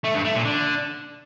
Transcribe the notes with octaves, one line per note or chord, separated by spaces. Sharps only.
A3
G2
A3
A#2
D3